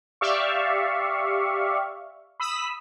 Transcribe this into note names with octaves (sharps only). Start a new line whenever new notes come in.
G4 D5 E5 F5 C#6
B5 D#6 E6 B6